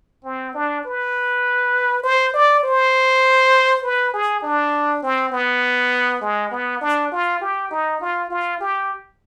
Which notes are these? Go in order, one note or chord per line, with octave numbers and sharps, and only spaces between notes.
C4
D4
B4
C5
D5
C5
B4
G#4
D4
C4
B3
G#3
B3
D4
F4
G4
D#4
F4
F4
G4